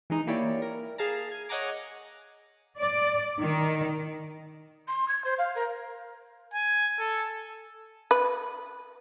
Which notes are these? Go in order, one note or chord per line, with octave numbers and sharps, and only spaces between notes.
E3 G#3 D#4
A#3 E4 G4 C#5 D5
A#4
G#4 F5 A5 A#5
G#6 D#7
C#5 D#5 F#5 G#5 A#5 D6
D5
D#3
C6
G#6
C5
F5
A#4
G#5
A4
B4